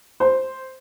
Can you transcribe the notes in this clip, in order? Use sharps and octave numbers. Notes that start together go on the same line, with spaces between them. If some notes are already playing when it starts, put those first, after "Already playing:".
C5